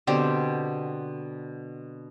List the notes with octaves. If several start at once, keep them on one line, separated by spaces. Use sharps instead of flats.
B2 D3 C4 G4